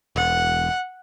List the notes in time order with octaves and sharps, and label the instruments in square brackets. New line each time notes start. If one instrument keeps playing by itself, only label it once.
[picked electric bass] E1 [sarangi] F#5